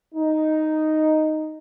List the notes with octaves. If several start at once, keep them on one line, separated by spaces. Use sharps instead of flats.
D#4